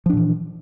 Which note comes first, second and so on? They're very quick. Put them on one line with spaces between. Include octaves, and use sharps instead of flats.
F3 D4 A#2 E3